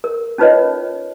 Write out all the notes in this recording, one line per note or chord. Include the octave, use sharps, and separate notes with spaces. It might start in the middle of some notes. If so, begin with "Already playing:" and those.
A#4
C#4 D#4 F4 B4 C#5 D#5